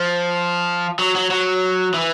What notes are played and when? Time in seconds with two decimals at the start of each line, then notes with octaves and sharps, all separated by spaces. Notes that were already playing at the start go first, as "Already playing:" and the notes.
Already playing: F3
0.99 F#3
1.15 F#3
1.31 F#3
1.94 E3